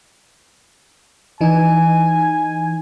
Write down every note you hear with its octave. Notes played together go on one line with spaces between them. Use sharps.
E3 D#4 G#5